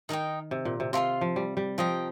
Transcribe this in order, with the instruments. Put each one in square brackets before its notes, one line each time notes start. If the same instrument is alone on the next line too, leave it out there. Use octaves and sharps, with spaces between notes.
[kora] D#3 [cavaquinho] D#4 A#4 D#5 G5
[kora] C3
A#2
C3
[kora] C3 [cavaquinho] F4 A#4 F5 C6
[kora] F3
G3
G3
[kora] F3 [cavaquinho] A#4 D#5 G5